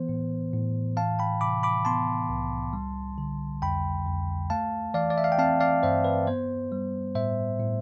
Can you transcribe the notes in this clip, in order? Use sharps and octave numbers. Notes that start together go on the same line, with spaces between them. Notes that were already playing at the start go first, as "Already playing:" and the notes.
Already playing: E3 B3 C5
A2
A2
E3 F5 A5
G5 B5
C3 B5 D6
B5 D6
B3 A5 C6
C2
G3
D3
F2 G5 B5
F2
A3 F5 A5
E3 D5 F5
D5
E5
F5
G5
C4 F5 A5
D5 F5
G2 C5 E5
B4
B3 C5
G3
A2 C5 E5
A2